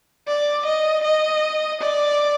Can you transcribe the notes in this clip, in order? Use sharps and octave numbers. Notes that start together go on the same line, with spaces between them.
D5
D#5
D#5
D5